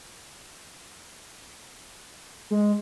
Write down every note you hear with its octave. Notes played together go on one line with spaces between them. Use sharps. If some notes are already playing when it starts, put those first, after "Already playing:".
G#3